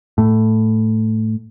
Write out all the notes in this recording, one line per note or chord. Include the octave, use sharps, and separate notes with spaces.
A2